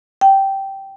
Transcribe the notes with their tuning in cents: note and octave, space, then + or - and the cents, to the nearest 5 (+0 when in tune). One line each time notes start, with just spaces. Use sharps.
G5 -10